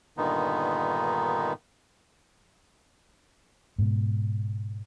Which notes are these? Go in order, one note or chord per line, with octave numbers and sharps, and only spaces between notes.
G2 A#2 D3 D#3 B3 D#4
G#2 B2